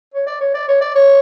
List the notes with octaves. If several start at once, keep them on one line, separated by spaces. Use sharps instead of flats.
C#5
D5
C#5
D5
C#5
D5
C#5